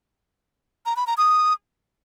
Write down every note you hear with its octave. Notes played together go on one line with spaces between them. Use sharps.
A#5
B5
A#5
D#6